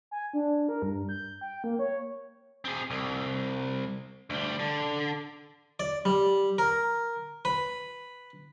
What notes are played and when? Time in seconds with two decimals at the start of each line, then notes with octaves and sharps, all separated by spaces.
0.11 G#5
0.34 D4
0.69 A#4
0.82 G2
1.09 G6
1.41 G5
1.64 A#3
1.79 C#5
2.65 C4 G#4
2.90 C2
4.30 D2 G3
4.59 D3
5.80 D5
6.05 G3
6.58 A#4
7.45 B4